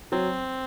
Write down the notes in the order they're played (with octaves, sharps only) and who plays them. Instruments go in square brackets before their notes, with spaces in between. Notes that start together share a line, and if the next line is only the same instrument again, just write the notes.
[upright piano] F#3 [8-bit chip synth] C4